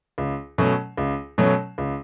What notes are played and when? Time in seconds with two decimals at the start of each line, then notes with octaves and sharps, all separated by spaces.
0.18 C#2
0.58 B2 F#3 A3 C#4
0.97 C#2
1.38 B2 F#3 A3 C#4
1.78 C#2